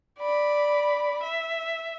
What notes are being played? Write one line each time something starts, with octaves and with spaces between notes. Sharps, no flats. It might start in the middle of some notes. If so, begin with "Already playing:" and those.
D5 B5
E5